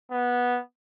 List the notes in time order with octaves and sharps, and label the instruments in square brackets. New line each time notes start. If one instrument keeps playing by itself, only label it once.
[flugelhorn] B3